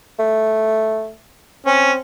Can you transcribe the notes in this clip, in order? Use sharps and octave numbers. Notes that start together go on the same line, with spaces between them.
A3
C4 C#4